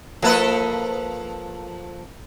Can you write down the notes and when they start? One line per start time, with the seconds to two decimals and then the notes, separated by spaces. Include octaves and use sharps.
0.22 F3 A#3 E4 A4 B4